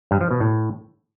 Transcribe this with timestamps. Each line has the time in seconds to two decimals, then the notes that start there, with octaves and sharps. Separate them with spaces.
0.11 G2
0.21 F3
0.31 B2
0.40 A2